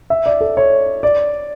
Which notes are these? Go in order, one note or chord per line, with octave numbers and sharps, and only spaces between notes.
E5
D5
A4
C#5
D5